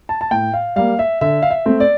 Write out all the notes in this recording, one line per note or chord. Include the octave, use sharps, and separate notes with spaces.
A5
A5
A2 G5
F5
G3 A#3 F5
E5
D3 E5
F5
E5
A3 C4
D5